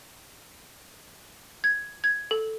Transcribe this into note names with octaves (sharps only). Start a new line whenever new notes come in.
G#6
G#6
A4